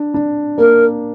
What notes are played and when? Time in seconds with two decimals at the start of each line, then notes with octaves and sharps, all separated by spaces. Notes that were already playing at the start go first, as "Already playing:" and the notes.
Already playing: D4
0.14 D4
0.58 A#3 A#4